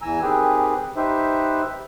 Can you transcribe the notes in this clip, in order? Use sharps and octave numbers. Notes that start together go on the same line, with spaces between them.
E2 E3 G#5 A#5 E6
D#3 C4 G4 G#4 B4
D#4 G4 B4 C5 E5